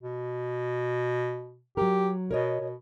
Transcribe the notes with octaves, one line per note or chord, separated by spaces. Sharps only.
B2
F#3 G4 A#4
B2 A#4 C#5 D#5
B2